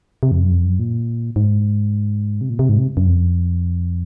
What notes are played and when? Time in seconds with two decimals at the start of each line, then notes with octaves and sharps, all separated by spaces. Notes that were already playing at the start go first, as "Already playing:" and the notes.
0.23 C3
0.31 F2
0.41 F#2
0.51 F2
0.65 F#2
0.79 A#2
1.36 G#2
2.41 C3
2.49 A#2
2.59 C3
2.69 G#2
2.78 C3
2.97 F#2
3.07 F2